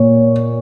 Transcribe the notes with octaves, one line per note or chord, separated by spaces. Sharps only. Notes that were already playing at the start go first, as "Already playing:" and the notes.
Already playing: A#2 C#5